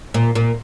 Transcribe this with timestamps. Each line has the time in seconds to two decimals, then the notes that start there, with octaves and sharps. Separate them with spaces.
0.14 A#2
0.35 A#2